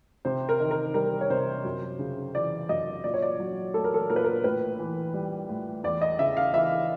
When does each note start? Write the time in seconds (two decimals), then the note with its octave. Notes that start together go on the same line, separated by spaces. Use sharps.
0.25 C3 C5
0.49 A#4
0.60 D#3
0.71 A#4
0.94 G3 A#4
1.21 C#5
1.30 C3 C5
1.64 F#2
1.99 C#3
2.34 E3 D5
2.69 F#2 D#5
3.04 A#2 D5
3.14 C#5
3.22 D5
3.40 F#3
3.74 A3 A4
3.84 A#4
3.94 A4
4.10 A#2 A#4
4.16 B4
4.24 A#4
4.44 A2 B4
4.79 E3
5.14 G3
5.49 A2
5.84 E2 D5
6.02 D#5
6.19 C#3 E5
6.37 F5
6.53 E3 E5